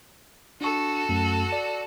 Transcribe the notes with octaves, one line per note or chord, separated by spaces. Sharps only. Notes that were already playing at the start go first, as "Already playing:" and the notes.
D4 F#4 A4 C#6
F#2 A3
D5